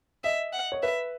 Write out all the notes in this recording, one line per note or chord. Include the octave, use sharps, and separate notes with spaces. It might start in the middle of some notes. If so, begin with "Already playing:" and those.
D#5 E5
F#5
C#5
B4 E5